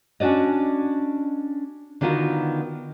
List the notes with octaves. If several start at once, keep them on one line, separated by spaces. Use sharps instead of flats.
C#4 D4 F#4 D5 D#5
D3 D#3 B3 F4 F#4 A#4